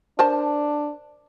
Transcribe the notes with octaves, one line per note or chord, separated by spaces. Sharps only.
D4 A#4 C5 A5